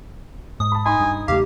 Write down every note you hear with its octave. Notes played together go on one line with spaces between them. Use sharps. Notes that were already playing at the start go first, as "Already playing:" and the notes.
G#2 D#6
A5 B5
D#4 G#5 B5 C6
G2
E2 C#3 A3 G4 F5